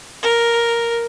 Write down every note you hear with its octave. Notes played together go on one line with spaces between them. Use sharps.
A#4